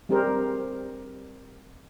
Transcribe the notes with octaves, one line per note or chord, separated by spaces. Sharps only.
G3 C4 G4 G#4 A#4 C5